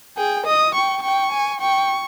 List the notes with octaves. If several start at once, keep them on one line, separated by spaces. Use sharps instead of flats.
G#4 G5
D#5 D#6
G5 C#6
G5 C#6
G#5
G5 C#6